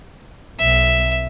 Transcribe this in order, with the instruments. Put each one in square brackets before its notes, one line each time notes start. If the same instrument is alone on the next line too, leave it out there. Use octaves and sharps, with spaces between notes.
[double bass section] B1 [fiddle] E5